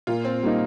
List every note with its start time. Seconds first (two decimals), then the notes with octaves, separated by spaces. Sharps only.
0.07 A#2 F4
0.25 C4
0.43 G3 A#3 D#4